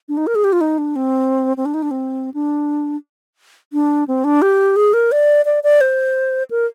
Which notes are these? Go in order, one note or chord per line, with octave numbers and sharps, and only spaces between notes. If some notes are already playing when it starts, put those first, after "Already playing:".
D4
D#4
A#4
G#4
G4
F4
D#4
D4
C4
C4
D4
D#4
D4
C4
D4
D4
C4
D4
G4
G#4
A#4
D5
D5
D5
C5
A#4